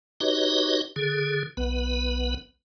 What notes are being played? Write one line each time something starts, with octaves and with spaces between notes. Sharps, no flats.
D#4 F#4 G4 B4 C#5 D#5
D3 G#4
B1 B3 B4